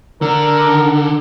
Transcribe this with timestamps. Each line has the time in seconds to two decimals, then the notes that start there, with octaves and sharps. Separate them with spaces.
0.22 D3 A#4